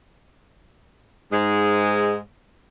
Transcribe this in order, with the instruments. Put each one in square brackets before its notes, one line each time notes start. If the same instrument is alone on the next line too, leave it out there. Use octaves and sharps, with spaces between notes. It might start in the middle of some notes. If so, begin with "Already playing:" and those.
[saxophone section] G#2 G#3